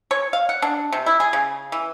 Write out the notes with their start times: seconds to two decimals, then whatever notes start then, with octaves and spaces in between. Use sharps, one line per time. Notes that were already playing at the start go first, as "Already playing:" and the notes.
0.11 C#5
0.33 F5
0.49 F#5
0.62 D4
0.93 C3
1.06 E4
1.20 G#4
1.33 C#3
1.72 E3